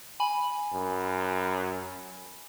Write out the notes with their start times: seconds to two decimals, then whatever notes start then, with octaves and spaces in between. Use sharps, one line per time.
0.20 G#5 B5
0.74 F#2